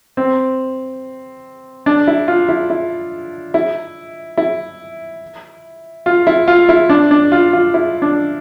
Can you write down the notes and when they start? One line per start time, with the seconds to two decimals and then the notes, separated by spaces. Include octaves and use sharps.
0.17 C4
1.86 D4
2.07 E4
2.28 F4
2.49 E4
2.70 E4
3.54 E4
4.37 E4
6.06 F4
6.27 E4
6.48 F4
6.69 E4
6.89 D4
7.11 D4
7.32 F4
7.53 F4
7.74 E4
8.02 D4